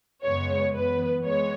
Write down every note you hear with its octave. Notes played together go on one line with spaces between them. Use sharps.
F#2 C#3 G#3 B3 C#5
F#2 E3 B3 B4
G#3 B3 C#5